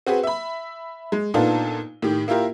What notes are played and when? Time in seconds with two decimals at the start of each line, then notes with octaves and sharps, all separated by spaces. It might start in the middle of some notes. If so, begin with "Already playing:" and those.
0.07 C4 F#4 G#4 B4
0.23 E5 B5
1.12 G#3
1.34 A#2 B3 D4 D#4 F4 A4
2.02 A2 D#3 G4
2.28 A#3 E4 F4 G4 A#4